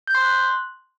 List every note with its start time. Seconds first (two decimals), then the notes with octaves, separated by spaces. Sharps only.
0.07 G6
0.15 C6
0.22 F#6